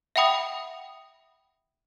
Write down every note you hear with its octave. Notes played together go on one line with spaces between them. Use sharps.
E5 F#5 G5 B5 D#6